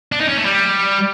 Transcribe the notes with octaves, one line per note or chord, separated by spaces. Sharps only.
D4
D#4
C#4
A3
G3